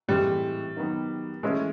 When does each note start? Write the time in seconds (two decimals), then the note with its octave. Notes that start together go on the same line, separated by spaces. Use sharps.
0.08 A2 E3 G3 G#3 C4
0.76 D#3 F#3 B3
1.43 E3 G#3 A3 C#4 E4 A4